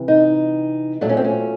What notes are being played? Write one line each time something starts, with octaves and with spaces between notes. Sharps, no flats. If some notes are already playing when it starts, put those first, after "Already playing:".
Already playing: C3 E3
D#4
A#2 F#3 A3 D4
C#4
C4
C#4